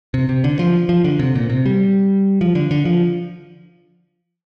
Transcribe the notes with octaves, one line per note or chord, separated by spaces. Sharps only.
C3
C3
D3
F3
F3
D3
C3
A#2
C3
G3
F3
D3
D3
F3